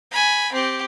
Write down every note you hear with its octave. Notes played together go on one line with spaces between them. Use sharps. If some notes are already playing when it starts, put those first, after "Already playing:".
G#5 B5
C4 G4